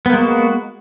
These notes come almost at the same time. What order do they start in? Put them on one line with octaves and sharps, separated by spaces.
B3 A#3 G#3 F#4